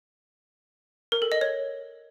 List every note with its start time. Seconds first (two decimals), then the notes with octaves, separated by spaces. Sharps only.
1.12 A#4
1.22 A4
1.32 D#5
1.41 C#5